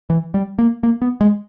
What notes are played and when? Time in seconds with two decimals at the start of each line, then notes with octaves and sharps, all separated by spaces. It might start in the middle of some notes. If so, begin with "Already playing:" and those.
0.10 E3
0.34 G3
0.59 A#3
0.83 A#3
1.02 B3
1.21 G#3